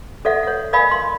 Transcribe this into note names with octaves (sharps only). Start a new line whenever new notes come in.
A4 D5 E5 F#5
C#5 F#5
A#4 D5 D#5 F5 G#5 B5
C6